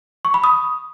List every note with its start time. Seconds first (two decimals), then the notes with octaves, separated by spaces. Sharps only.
0.25 C#6
0.34 B5
0.44 D#6